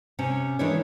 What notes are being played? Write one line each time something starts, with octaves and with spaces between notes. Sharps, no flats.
C3 C#4
D#3 E3 G#3 D4 E4 C#5